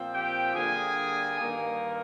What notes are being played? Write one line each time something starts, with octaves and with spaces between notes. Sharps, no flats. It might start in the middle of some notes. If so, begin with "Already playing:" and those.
Already playing: A#2 F3 C4
G4 G5
D3 G3 A#3 G#4 G#5
G2 D#3 A#3